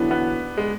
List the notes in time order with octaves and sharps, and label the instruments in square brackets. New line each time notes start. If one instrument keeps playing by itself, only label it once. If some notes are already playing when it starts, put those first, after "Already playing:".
Already playing: [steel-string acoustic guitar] E2 D3 F#3 [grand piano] B3 D4
[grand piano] B3
G#3